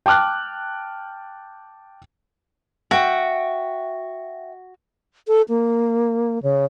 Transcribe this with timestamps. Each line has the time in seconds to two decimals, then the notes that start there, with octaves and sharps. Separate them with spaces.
0.06 G5 A5 D6 F6 F#6
2.91 F#4 E5 G5
5.28 A4
5.49 A#3
6.43 C#3